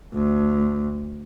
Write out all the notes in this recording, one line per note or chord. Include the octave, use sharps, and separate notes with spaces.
D2